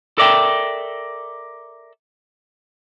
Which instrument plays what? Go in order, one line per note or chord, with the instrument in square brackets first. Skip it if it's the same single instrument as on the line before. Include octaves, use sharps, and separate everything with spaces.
[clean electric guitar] A4 A#4 D5 E5 F#5 G5